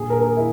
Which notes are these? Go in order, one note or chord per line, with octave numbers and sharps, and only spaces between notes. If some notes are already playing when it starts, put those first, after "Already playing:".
Already playing: A#2 G#4
A#4
A#4
G#4
E4